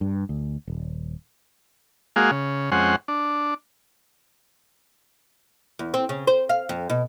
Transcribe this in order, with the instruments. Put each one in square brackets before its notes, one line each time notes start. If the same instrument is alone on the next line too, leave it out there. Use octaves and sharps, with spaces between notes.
[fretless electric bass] G2
D2
D#1
[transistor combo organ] G#3 A#3 F#4 G#4 F5
C#3
F2 G#3 C#4 C5 F#5
D4
[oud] E2
C4
C#3
C5
F5
F2
B2